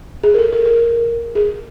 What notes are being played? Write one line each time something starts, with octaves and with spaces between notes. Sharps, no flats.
G#4
A#4
A4
A#4
A#4
G#4